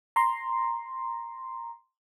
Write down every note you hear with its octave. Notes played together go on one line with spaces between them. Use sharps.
A#5 C6